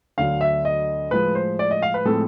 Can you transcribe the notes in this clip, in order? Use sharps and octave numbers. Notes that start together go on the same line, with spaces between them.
D2 D3 F#3 F5
E5
D#5
A2 F3 G#3 B4
C5
D5
D#5
F5
B4
A2 F3 G#3 C4 A4